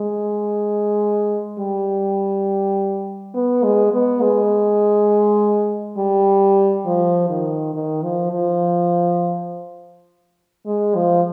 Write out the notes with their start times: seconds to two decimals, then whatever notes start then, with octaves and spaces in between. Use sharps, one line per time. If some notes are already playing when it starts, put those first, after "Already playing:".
Already playing: G#3
1.59 G3
3.34 B3
3.63 G#3
3.93 B3
4.22 G#3
5.98 G3
6.86 F3
7.30 D#3
7.74 D#3
8.03 F3
8.32 F3
10.66 G#3
10.95 F3